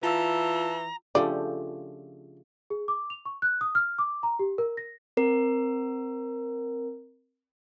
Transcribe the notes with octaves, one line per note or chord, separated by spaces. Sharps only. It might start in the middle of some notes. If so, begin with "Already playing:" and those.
E3 F4 F5 A5 A#5 E6
C#3 F3 A3 D4 F4 G4 D5
G#4
D6
F7
C#6
F#6
D#6
F6
D6
A#5
G4
A#4
A#6
C4 A#4